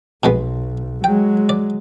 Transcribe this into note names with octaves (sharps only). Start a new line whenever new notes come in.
B1 B2 G#3 B3
F#3 G#3 G5
D5